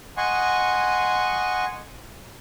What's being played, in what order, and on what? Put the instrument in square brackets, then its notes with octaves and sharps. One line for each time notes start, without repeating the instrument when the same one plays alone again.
[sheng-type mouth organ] D#5 F#5 G#5 C6 C#6